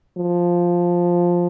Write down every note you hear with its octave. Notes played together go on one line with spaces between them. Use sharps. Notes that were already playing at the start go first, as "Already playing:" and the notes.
F3